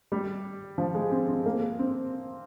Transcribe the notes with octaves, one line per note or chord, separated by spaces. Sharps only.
G3
F3
G#3
C4
C4
A#3
C4